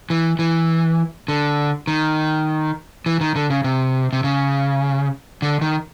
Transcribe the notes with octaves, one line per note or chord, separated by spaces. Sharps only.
E3
E3
D3
D#3
E3
D#3
D3
C#3
C3
C3
C#3
D3
D#3